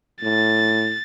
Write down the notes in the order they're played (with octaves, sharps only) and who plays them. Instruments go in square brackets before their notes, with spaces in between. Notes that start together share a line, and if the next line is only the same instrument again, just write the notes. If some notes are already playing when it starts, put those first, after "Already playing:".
[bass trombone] A2 [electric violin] A6